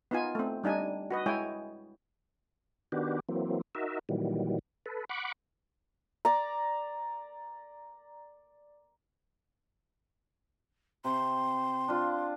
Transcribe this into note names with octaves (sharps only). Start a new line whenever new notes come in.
B3 D#4 F4 G#5
A3 C4
G3 D4 D#4 G#5
F#4 B4 D#5
G#3 E4 C#5 G5 G#5
D#3 B3 D4 F#4 G4
E3 F#3 A#3 C4
D#4 F#4 A#4 E5
A#2 D#3 E3 F#3 G3
A4 B4
F#5 B5 C#6 D6
D5 A#5
C3 C6
D4 F4